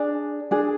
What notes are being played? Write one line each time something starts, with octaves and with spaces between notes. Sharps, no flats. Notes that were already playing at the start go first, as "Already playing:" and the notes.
Already playing: D4 G#4
D4 G#4